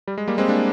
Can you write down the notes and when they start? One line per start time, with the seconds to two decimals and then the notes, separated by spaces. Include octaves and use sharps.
0.07 G3
0.18 G#3
0.28 G3 A#3
0.38 G#3 C4
0.48 A#3 D4